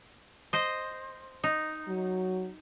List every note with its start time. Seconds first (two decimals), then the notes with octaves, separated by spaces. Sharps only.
0.53 C5 D#5
1.44 D#4
1.88 F#3